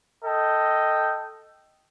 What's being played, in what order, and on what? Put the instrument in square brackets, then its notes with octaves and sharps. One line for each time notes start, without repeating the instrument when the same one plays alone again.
[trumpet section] A4 D#5 G5